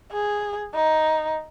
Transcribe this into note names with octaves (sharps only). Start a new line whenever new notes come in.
G#4
D#4